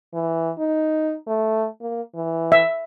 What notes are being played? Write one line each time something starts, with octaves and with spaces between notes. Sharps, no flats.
E3
D#4
A3
A#3
E3
E5